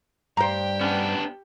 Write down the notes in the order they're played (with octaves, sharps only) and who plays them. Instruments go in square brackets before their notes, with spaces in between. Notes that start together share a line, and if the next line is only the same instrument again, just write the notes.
[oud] G2 C5 [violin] G4 G5 [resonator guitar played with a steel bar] A#5
[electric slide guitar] B3 D4 [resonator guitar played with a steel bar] C#4